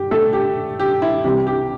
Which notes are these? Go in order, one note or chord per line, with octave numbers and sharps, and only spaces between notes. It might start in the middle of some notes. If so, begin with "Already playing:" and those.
Already playing: G2 G4
A3 A4
G4
G4
E4
C2 C3 E3 G3 G4
G4